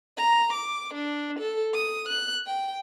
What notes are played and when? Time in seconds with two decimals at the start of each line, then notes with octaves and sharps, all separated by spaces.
0.17 A#5
0.53 D6
0.94 D4
1.39 A4
1.74 D#6
2.09 F#6
2.47 G5